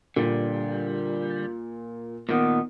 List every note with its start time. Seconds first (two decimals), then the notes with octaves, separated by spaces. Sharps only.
0.16 A#2 D3 G3
2.29 A#2 D#3 B3